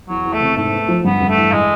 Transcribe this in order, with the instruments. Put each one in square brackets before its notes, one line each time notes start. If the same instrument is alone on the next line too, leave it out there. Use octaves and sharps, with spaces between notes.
[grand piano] E2 [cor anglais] F#3
[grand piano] E2
[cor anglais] A3
[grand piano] C3
[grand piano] G#2 [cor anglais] A3
[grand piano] B3
F3
[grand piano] G2 [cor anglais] B3
[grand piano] G2
[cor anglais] A3
[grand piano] E3
[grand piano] A2 [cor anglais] G#3